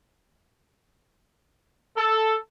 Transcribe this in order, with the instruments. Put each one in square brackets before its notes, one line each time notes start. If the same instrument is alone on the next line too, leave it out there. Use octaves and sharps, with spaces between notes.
[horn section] A4